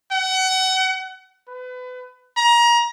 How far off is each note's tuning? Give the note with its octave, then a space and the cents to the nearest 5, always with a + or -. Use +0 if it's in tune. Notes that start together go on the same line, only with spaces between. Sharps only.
F#5 +30
B4 +30
A#5 +25